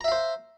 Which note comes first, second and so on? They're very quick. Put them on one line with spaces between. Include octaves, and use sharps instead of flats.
A#5 E5 F5 C5